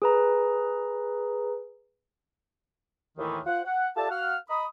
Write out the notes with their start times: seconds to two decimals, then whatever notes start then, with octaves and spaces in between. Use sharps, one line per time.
0.02 G#4 B4 A#5
3.18 D#2 A2 D#3 E3
3.47 F4 C5 F#5
3.65 F#5
3.96 F4 G4 A4 D5 E5 A5
4.10 F#4 F5 F#5 F6
4.49 D#5 A#5 B5 D#6